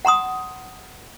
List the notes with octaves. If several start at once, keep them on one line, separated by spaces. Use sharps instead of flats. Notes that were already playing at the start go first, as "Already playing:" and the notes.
F#5 A#5 C6 D#6